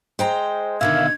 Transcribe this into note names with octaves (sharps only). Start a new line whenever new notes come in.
G#3 C5 G5 A#5
B2 D3 D#3 A#3 E5 F5 G#6